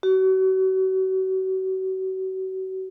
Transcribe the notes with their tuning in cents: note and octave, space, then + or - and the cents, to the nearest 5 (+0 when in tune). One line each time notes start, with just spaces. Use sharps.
F#4 +35